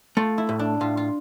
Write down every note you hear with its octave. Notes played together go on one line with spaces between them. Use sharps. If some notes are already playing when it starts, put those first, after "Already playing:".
A3 F4
E4
A2
D4
A2 F4
F4